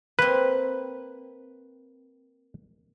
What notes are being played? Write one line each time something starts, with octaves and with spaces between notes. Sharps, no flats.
A#3 C4 B4